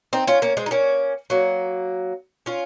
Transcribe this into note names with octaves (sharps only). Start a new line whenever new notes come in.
C4 D#4
C#4 F4
A#3 C#4
G#3 C4
D#4
A#3 C#4
F#3 A#3
C#4 F4